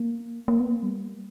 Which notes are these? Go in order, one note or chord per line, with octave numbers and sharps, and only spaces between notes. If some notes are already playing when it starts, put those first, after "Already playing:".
Already playing: A#3
A#3
B3
A#3
G3